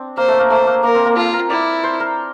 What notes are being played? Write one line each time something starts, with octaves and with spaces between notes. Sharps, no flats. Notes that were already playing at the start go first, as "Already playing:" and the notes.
Already playing: C4 D4
A#3 C5
A3
A#3
A3 C5
A#3
A#3 A#4
C4
A#3
F4 A4
A#4
E4 D5
C5
A#4